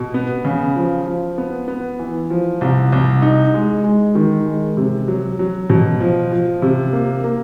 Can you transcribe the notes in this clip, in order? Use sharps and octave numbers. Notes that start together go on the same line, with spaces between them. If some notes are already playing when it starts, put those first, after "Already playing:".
Already playing: B2
B3
C#3
F3
F3
B3
B3
E3
F3
C2
C2
D#4
G#3
G#3
D#3
G#3
C3
F#3
F#3
B2
F3
F3
C3
A#3
A#3